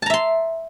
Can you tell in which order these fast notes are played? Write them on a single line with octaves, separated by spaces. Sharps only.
A5 A#5 E5 C6